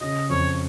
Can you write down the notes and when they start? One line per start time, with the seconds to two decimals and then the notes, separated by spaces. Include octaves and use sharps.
0.01 C#3 D#5
0.30 F2 C#5